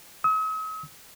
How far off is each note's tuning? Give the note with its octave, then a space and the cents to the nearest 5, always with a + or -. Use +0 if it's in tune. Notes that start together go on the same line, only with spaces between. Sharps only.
D#6 +45